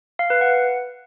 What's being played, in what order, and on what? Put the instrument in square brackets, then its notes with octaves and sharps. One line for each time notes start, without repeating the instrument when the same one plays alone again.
[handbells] F5
B4
F#5